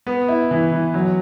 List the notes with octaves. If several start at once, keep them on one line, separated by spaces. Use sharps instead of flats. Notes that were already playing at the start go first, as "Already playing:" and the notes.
B3
E4
E3
E3
F#3